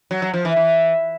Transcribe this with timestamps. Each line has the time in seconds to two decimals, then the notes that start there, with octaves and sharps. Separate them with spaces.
0.11 F#3
0.22 F#3
0.34 F3
0.45 E3
0.56 E3